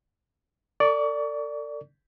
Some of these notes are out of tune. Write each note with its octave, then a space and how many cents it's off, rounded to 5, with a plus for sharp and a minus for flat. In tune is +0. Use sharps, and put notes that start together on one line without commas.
A4 +45 D5 +0 C#6 +35